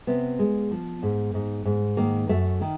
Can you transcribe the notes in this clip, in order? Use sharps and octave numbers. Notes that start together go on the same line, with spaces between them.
C3 B3
G#3
F3
G#2
G#2
G#2
D#3 A#3
F#2 A3
D#3